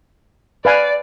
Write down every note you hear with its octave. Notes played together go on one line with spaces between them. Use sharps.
B4 D5 F5 G#5